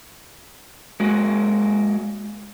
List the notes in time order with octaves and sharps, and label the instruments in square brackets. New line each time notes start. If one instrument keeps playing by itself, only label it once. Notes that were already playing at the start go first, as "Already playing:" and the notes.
[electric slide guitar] G#3 A#3 F#4